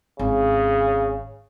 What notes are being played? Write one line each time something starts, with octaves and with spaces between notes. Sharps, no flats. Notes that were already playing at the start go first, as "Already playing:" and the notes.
G#1 C#3